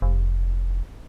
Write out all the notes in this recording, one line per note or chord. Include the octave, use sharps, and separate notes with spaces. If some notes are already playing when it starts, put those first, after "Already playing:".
F1